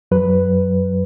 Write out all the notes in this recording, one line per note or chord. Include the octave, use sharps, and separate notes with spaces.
F#2 F#3 B4